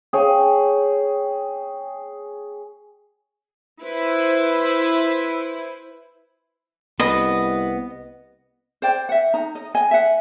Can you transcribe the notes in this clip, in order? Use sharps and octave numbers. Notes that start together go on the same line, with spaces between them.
G#4 C#5 G5
E4 B4 C5
C2 B3 D#5 B5
C5 D5 G5
E5 F#5
D#4 A#5
D#5
D#5 G#5
E5 F#5